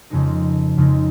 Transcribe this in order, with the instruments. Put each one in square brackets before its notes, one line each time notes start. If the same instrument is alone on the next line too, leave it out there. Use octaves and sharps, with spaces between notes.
[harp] F2 C#3 G#3 D#4 A#4
F2 C#3 G#3 D#4 A#4